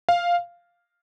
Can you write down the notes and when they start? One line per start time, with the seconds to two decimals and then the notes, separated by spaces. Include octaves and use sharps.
0.09 F5